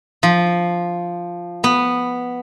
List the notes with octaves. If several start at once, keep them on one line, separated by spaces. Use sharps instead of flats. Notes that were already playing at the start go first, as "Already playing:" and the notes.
F3
B3